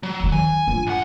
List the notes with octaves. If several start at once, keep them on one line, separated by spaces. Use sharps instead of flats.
F#3
D#2 D#3
G#5
G2 F4
B1 F#5